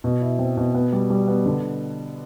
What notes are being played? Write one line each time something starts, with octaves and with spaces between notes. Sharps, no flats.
B2
E4
C4
B2
B3
G3
G3
B3
D3